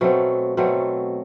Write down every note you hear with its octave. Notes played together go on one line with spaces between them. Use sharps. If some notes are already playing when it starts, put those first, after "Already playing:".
B2 F#3 A3 C4
B2 F#3 A3 C4